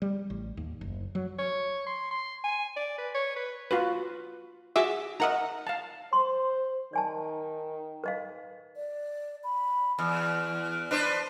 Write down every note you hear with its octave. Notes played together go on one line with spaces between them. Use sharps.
G3
A1
D#2
F#1
F#3
C#5
C6
C6
G#5
D5
B4
C#5
B4
F4 F#4 B4
F#4 G#4 E5 D6 E6
D#4 A#4 D#5 E5 F#5 A#5
F5 A5
C5 C6
D#3 D5 G#5 A5
B4 D#5 F5
D5
B5
E2 F6
D4 B4 C5